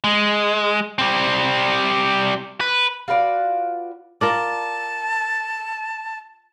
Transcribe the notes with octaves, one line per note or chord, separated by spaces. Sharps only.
G#3
G3 C4
B4
F4 F#4 B4 D5
F4 A#4 D5 A5